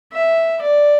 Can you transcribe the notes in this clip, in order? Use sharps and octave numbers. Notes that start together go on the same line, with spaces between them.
E5
D5